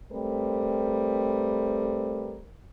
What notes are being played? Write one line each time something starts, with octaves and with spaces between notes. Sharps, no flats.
G3 A3 C4 A#4 B4